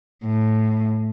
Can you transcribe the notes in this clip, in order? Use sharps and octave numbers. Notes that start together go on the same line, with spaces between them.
A2